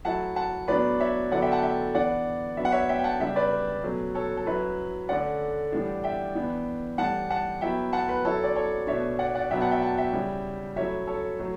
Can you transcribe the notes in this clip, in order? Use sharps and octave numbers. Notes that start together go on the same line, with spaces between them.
F#3 A3 E4 F#5 A5
F#5 A5
A2 F#3 B3 D4 B4 D5
C#5 E5
D3 F#3 B3 E4 D5 F#5
E5 G5
F#5 A5
E5 G5
E3 B3 D4 D5 F#5
F#3 B3 D4 E5
F#5
C#5 E5
E5 G5
G5
F#5 A5
C#3 G3 D4 E5 G5
B4 D5
B4
B2 F#3 A3 C#4
A4 C#5
A4
F#3 C#4 E4 B4
D3 A3 C#4 D5 F#5
A2 E3 G3 D4
E5 G5
E3 B3 D4
A2 E3 G3 F#5 A5
F#5 A5
F#3 B3 E4 E5 G5
F#5 A5
B4
F#3 C#4 E4 A4 C#5
D5
A4 C#5
B2 A3 D4 C#5 E5
D5 F#5
D5 F#5
B2 F#3 B3 D4 E5 G5
F#5 A5
E5 G5
F#5 A5
E5 G5
C#3 G3 C#4 E4
F#3 A3 C#4 E4 C#5 E5
A4 C#5
F#3 A3